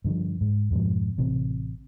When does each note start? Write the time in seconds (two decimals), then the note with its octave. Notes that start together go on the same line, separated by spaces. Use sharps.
0.04 G2 D3 F3
0.41 G#2
0.71 F2 G#2 B2 F3
1.18 A1 C3